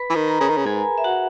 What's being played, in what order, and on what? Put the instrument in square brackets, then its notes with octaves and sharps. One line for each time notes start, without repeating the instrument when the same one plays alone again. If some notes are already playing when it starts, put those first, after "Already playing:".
Already playing: [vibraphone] B4 B5
[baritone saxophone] E3
D#3
[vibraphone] A#4 A#5
[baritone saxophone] C#3
D#3
C#3
[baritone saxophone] G#2 [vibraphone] G#4 G#5
[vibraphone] E5
F#4 F#5